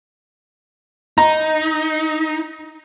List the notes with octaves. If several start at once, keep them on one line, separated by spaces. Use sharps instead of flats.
D#4 A#5